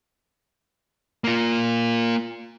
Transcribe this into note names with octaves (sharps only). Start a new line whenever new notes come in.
A#3 F4